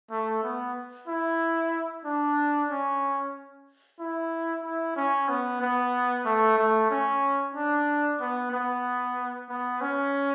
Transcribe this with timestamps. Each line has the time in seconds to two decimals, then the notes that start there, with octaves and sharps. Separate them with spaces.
0.10 A3
0.43 B3
1.08 E4
2.05 D4
2.69 C#4
3.99 E4
4.63 E4
4.96 C#4
5.28 B3
5.61 B3
6.25 A3
6.57 A3
6.90 C#4
7.55 D4
8.20 B3
8.52 B3
9.49 B3
9.81 C#4